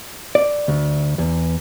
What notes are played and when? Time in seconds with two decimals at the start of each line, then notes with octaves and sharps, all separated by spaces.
0.35 D5
0.68 D2
1.18 E2